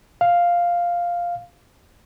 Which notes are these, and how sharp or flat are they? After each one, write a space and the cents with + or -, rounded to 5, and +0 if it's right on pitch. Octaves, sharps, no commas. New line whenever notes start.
F5 +0